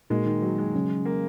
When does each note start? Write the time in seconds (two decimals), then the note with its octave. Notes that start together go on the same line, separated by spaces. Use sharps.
0.10 A#2 G#3 A#3 D#4 F#4 A#4
0.26 D#3
0.42 F#3
0.58 G#3
0.75 C#3 F#3 C#4
1.05 A#3